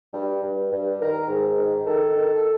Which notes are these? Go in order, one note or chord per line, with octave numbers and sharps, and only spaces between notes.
G2
G2
G2
D#3 A#4
G#2
D#3
D#3 A4
D#3